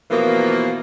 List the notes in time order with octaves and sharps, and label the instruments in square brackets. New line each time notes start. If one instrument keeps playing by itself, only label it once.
[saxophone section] B2 E3 F3 A#3